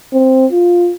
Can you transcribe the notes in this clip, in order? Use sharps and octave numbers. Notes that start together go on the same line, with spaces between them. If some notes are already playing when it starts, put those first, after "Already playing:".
C4
F4